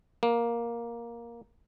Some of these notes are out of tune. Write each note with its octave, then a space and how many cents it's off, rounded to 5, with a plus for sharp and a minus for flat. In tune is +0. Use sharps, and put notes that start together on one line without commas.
A#3 +10